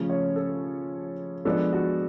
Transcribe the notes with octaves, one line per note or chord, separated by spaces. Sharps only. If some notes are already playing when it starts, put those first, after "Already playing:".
Already playing: C#3 F3 A3 C#4
C#5
A4
F3 G#3 B3 D4 A4
F#4